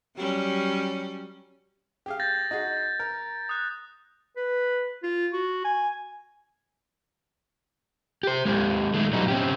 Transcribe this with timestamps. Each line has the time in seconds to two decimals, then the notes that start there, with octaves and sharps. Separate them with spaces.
0.16 F#3 G3 C#4
2.06 G4 G#4 F5
2.20 G6 A6 A#6
2.51 D#4 F#4 G#4
2.99 A#4
3.49 D#6 F#6
4.37 B4
5.03 F4
5.33 F#4
5.64 G#5
8.23 G4 C5
8.45 G#3 C4 G4
8.94 D#3 G#3 A3
9.13 B2 F#3 G3 B3 D#4
9.28 C4 C#4 G4